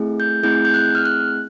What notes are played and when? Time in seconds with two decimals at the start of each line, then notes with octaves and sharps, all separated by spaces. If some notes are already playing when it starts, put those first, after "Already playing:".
Already playing: A3 C4 E4 G#4
0.20 G6
0.43 A3 C4 E4 G#4 G6
0.65 G6
0.74 F#6
0.95 F6
1.05 F#6